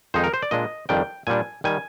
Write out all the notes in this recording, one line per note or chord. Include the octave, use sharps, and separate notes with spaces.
F2 D#3 G#3 D#4 C5
A#4
C5
D5
A#2 G#3 D4 D#5
F2 D#3 G3 D4 G5
A#2 G3 D4 G#5
D#3 G3 G#5